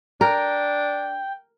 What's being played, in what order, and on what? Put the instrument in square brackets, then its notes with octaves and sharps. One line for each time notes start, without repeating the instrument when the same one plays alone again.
[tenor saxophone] D4 [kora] A#4 [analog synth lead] G5